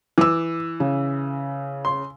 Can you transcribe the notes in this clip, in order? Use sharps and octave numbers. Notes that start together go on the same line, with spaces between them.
E3 D6 E6
C#3
C6